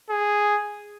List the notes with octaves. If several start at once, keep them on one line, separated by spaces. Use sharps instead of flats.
G#4